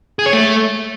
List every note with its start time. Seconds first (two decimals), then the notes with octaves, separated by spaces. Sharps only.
0.19 G#4
0.26 C#5
0.33 A3